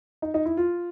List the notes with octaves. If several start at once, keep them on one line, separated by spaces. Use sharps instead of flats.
D#4
D#4
E4
F4